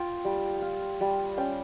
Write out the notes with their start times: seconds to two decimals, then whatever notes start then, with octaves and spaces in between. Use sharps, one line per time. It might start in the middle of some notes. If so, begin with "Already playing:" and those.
Already playing: F4 G5
0.25 G3
0.62 F4
1.01 G3
1.37 C#4 G5